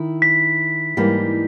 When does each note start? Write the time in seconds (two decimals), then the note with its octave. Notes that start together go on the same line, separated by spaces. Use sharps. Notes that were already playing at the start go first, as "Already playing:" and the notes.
Already playing: D#3 E4
0.22 B6
0.97 G#2 E3 G3 A#3 D#4